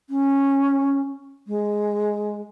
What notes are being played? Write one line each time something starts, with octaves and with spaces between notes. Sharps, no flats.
C#4
G#3